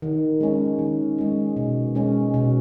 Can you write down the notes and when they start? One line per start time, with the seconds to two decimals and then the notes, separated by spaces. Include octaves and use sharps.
0.02 D#3
0.41 G#3 C#4
0.79 D#3
1.18 G#3 C#4
1.56 B2
1.95 G#3 C#4
2.34 B2